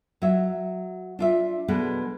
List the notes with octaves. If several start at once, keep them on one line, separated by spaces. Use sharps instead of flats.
F#3 E5
D4 F4 E5
B2 G#3 B3 D4 A4